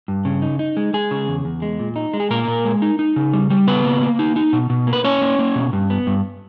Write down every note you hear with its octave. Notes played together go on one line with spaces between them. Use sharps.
G2
C#3
D#4
D#4
G#3
G#3 G#4
C#3
E2
E2
G#3
A#2
D#4
G#3
G#4
A#2 A#3 A#4
A#2
G#3
D#4
D#4
C#3
G3
G3
C#3 B3 B4
A#3
A#3
D#4
D#4
B2
B2
A#3
B4
A#3 C#4 C#5
A#3
A#3
B2
G2
B3
G2